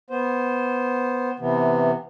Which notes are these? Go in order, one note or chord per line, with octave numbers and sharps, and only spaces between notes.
B3 C5
C3 E3 B3